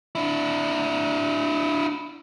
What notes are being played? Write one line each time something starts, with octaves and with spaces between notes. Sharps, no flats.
D4 E4